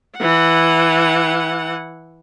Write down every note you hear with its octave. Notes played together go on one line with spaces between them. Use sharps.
E3 F#5